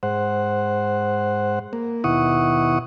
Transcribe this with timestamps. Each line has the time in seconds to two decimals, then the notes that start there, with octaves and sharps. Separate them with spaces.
0.03 G#2 C5 F#5
1.73 A#3
2.04 D#2 B2 E4 F#5 C#6 D#6